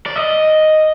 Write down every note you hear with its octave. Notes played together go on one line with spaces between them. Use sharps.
D5
D#5